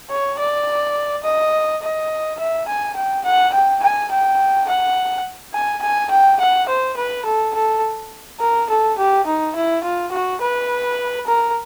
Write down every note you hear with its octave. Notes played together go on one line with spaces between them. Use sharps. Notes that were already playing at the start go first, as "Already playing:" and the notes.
C#5
D5
D#5
D#5
E5
G#5
G5
F#5
G5
G#5
G5
F#5
G#5
G#5
G5
F#5
C5
B4
A4
A4
A#4
A4
G4
D#4
E4
F4
F#4
B4
A#4